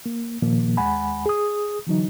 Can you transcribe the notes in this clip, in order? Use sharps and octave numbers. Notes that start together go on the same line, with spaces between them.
A#3
A#2 D#3 F3 A#3
D#2 G#3 F#5 G#5 B5
G#4 D#6
D3 E3 F#3 D#4